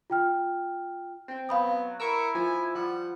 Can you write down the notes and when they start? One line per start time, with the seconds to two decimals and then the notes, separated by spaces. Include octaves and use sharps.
0.10 F4 G5 F6
1.28 C4 G5
1.49 F#3 B3 F5 B5 D#6
2.00 E4 A#4 C#6 E6
2.35 F3 G#5
2.75 F3 G3 F#5